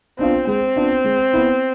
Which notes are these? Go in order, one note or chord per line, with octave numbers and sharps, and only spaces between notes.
B3 C4 D4 F4
G#3 C4
B3 D4 F4
G#3
B3 E4